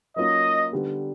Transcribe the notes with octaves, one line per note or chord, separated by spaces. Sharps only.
F#3 A#3 C#4 F4 D#5
D3 G3 B3